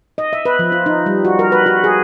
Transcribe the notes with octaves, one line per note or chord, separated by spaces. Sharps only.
D#5
E5
B4
F3
F4
D#4
G3
F#4
A#4
B4
F#4
G#4